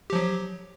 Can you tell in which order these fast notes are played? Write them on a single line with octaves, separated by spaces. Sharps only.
G4 F3 F#3